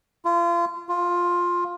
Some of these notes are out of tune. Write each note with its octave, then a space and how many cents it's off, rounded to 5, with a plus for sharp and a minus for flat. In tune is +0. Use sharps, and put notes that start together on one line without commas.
F4 -30
F4 +10